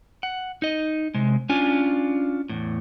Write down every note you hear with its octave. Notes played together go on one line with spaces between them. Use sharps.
F#5
D#4 D#5
C3 G#3
C#4 D4 F4 G#5
E2 A2